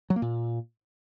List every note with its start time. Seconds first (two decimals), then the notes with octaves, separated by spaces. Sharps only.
0.10 F#3
0.16 A#3
0.22 A#2